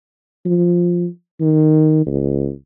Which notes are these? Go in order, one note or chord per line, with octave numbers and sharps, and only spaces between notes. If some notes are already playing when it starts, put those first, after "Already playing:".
F3
D#3
C#2